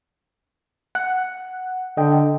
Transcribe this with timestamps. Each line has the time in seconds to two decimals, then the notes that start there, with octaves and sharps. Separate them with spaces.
0.95 F#5
1.97 D3 D#5 G5